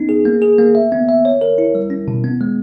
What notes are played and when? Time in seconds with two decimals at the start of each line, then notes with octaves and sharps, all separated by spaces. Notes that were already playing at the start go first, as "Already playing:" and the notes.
Already playing: B3 C#4 D#4
0.09 G#4
0.25 A#3
0.42 G#4
0.58 A#3
0.75 E5
0.92 B3
1.09 E5
1.25 C#5
1.41 A#4
1.58 E4
1.75 G3
1.90 C#4
2.08 B2
2.24 B3
2.41 G#3